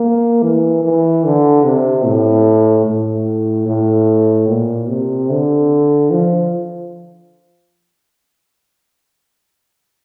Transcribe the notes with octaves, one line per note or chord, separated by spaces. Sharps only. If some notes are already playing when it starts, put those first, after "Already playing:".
Already playing: A#3
E3
E3
D3
C3
A2
A2
A2
A#2
C3
D3
F3